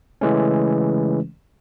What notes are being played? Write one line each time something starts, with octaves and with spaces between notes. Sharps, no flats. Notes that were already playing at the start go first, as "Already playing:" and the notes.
C#3 E3 G#3 A3 C#4